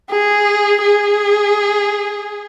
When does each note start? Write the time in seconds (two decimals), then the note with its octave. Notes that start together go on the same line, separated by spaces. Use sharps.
0.11 G#4
0.83 G#4